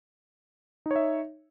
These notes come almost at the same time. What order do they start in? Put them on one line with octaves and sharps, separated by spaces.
D#4 C#5 E5